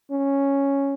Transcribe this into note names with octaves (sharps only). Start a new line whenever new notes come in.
C#4